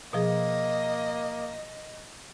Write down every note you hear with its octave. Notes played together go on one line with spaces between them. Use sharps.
B2 F3 A#3 G#4 D#5